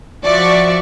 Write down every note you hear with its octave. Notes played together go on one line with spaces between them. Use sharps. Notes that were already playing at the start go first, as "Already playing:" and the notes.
F3 F#4 D5 E5 C#6